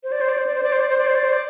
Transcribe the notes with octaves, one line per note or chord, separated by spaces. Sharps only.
C5
D5
C5
D5
C5
D5
C5
D5
C5
D5
C5
D5
C5
D5
C5
D5